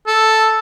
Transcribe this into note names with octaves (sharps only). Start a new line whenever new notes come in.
A4